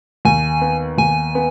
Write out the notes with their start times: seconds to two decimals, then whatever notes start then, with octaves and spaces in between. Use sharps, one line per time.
0.25 D#2 G#5
0.61 B3
0.98 D#2 G#5
1.35 B3